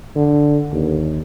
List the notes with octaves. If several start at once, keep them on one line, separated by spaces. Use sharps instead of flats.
D3
D#2